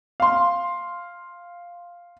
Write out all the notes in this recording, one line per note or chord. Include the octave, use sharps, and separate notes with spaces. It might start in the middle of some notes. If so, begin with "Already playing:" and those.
F5 C6